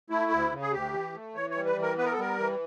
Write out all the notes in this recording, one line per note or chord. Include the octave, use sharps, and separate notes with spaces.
A3 E4
D2
C#3
G#4
D2 G4
E3
A3
E3 C#5
C#5
G3
B4
E3
A#4
B3 B4
A#4
A4
G3 A#4
E3